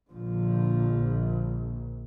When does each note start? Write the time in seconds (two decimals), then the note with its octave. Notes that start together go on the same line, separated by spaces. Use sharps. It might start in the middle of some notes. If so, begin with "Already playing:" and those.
0.11 A#1 D3 F3